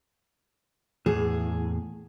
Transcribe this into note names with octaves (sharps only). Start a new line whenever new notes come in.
E2 A2 G#4